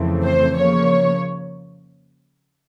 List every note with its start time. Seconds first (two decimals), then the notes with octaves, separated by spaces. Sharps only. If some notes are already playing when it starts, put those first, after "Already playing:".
Already playing: F2 C#3 E3 A3 C4
0.24 C5
0.57 C#3 F3 A#3 C#5